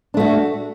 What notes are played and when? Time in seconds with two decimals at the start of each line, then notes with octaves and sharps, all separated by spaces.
0.14 D4
0.17 A3
0.20 F#4